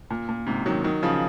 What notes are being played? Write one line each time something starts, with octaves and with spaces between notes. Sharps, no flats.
A#2
A#2
G#2 C3
D#3 F#3
D#3 F#3
C#3 F3